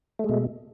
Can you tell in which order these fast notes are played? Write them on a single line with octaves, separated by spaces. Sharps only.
A3 G#3 B2